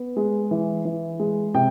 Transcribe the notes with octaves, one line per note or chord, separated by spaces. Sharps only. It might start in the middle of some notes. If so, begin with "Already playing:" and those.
Already playing: B3
G#3
E3
E3
G#3
C3 G5